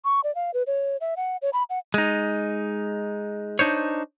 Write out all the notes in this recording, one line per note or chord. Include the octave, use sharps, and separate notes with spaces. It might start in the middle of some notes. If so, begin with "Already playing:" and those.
C#6
D5
F5
B4
C#5
E5
F#5
C#5
B5
F#5
G#3 D#4
D4 D#4 C5 C#5